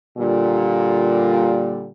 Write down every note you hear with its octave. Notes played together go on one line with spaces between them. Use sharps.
A#2 D3 G3